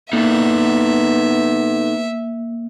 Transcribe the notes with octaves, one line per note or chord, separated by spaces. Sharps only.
A#3 B3 D#4 A4 A#4 E5